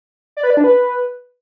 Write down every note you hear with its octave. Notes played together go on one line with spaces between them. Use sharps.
D5
B4
D5
D4
B4